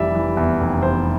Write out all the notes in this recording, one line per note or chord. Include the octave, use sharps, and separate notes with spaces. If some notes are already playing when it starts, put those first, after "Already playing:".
Already playing: F1 E3 G3 D5 E5
E3
E2 E5
F1
E2 C5